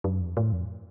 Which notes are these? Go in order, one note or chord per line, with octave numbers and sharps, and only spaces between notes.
F#2
F2
A2
F2